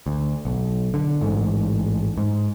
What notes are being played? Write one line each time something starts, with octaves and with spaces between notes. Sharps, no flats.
D2
B1
D3
A1 G#2
G#2